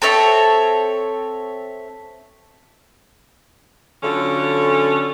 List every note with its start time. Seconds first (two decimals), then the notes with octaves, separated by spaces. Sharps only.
0.02 C4 A4 C#5 E5
4.03 D3 F#3 C#4 F4 A4